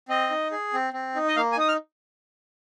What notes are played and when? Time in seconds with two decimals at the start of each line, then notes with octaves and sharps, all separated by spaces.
0.09 C4 D#5
0.30 D#4
0.51 G#4
0.73 C4
0.93 C4
1.15 D#4
1.28 D#5
1.36 A#3 F5
1.52 G#5
1.57 D#4 D#6
1.68 F6